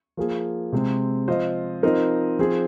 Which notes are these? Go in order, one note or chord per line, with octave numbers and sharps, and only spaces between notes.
F3 A#3 G#4
C3 G#3 C4
F3 C4 F4 C5 D#5
F3 C4 D#4 A#4 D#5
F3 C4 G#4